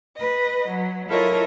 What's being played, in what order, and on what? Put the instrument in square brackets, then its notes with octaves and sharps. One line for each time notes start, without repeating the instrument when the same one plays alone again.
[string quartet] B4 D#5
F#3
E4 F4 A4 A#4 C#5 D#5